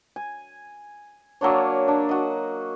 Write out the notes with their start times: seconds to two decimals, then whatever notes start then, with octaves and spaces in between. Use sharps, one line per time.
0.16 G#5
1.41 F#3 A#3 D4 C#5
1.88 D4
2.09 F#4 D#5